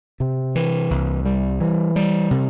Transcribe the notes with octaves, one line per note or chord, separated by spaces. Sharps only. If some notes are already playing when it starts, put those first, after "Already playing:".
C3
E3
C2
G3
E3
G3
C3